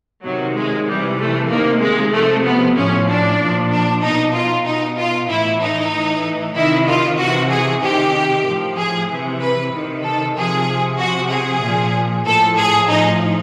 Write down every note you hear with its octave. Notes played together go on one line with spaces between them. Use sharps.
C3 D#3 F#3
G#3
C3 E3 G3
A3
C3 D#3 A#3
G#3
C3 F3 A3
B3
A2 F3 C#4
D4
A#2 F3
D4
B2 D#4
F4
B2 D#4
F4
A2 E3 E4
D#4
A2 E3
C3 D#3 E4
F4
C3 E3 F#4
G#4
C3 D#3 G4
A2 F3
G#4
C3 E3
B4
C3 D#3
A4
C3 F3 G#4
C3 F3 F#4
G#4
A#2 F3
A2 F3 A4
G#4
A2 F3 D#4